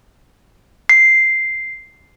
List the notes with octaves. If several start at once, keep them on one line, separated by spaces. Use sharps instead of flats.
C7